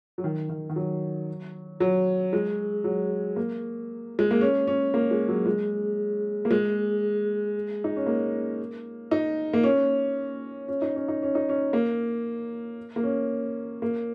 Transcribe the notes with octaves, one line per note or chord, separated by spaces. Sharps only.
F#3
D#3
D#3
D#3
F#3
F#3
G#3
F#3
A#3
G#3
A#3
C#4
C#4
A#3
G#3
F#3
G#3
A#3
G#3
D#4
C#4
A#3
D#4
A#3
C#4
C#4
D#4
C#4
D#4
C#4
D#4
C#4
A#3
A#3
C#4
A#3